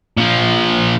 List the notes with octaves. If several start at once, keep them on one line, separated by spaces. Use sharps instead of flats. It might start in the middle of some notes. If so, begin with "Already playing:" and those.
A#2 F3